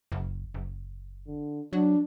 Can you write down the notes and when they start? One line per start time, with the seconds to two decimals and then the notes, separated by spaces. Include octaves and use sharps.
0.12 F#1
0.54 F#1
1.27 D3
1.73 F#3 D4